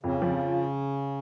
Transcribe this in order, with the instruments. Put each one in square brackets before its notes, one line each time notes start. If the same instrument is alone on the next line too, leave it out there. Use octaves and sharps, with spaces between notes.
[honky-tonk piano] F2 [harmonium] C#3
[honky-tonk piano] F3